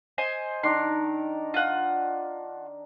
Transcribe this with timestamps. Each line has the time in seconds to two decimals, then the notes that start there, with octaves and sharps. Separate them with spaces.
0.18 C5 D#5 G#5
0.63 D#3 D4 A#5 C6
1.54 F4 F#5